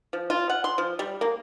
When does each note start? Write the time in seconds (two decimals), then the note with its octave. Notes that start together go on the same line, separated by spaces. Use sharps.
0.13 F3
0.30 F4
0.50 F#5
0.64 C6
0.78 F3
0.99 G3
1.21 A#3